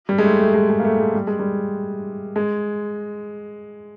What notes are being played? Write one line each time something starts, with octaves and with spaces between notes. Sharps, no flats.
G3
G#3
A3
A3
G#3
G#3
A#3
A3
G#3
G3
G#3
G3
G#3